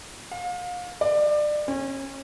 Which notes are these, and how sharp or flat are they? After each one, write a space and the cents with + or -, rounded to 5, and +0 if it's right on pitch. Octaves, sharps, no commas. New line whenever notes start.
F5 +35
D5 +25
C#4 -30